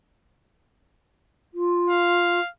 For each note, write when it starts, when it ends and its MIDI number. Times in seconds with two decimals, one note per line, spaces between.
1.54 2.40 65
1.90 2.49 77